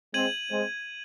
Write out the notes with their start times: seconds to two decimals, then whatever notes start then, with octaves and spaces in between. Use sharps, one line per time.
0.14 G#3 C4 G#6 D#7 F#7
0.51 G#3 C4